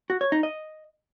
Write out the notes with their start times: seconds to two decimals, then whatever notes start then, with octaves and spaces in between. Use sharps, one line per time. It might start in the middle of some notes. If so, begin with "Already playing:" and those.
0.10 F#4
0.21 C#5
0.32 D#4
0.43 D#5